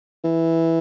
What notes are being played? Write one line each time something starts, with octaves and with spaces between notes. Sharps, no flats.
E3